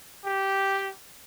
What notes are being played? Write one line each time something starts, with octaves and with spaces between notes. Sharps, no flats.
G4